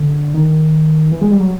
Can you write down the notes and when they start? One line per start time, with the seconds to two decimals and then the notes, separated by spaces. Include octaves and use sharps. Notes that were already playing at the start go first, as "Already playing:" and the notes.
Already playing: D3
0.34 D#3
1.12 E3
1.21 G#3
1.31 G3
1.40 F#3